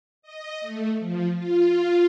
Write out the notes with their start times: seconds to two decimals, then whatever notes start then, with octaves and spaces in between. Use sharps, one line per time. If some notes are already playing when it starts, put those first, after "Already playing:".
0.22 D#5
0.61 A3
0.99 F3
1.33 F4